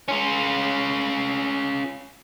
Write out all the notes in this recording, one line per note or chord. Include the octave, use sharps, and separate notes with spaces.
C#4 F4